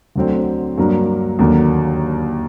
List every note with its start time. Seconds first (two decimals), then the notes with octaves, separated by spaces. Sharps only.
0.16 D2 D3 F#3 C4
0.78 G2 F#3 A#3
1.39 D#2 D3 F#3 A#3